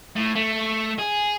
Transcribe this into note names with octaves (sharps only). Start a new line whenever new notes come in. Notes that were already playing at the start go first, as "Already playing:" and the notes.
A2
A3
G#4